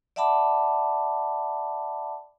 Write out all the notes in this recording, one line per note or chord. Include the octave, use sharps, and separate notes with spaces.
D5 E5 F#5 A5 B5 D6